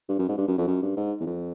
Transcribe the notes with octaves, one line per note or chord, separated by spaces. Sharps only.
G2
F#2
G#2
G2
F#2
F2
F#2
G2
G#2
E2
F2